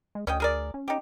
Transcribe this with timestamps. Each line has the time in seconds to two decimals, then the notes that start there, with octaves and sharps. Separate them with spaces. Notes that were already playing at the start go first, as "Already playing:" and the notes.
0.15 G#3
0.27 D2 C#4 D#5 G5
0.40 G#4 A#4 D5
0.74 C#4
0.88 C#4 D#4 G4